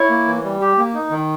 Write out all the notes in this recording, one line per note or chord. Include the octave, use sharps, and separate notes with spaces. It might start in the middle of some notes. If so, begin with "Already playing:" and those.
Already playing: E4 C#5
A#3
E3
G3
G4
A#3
D#4
D#3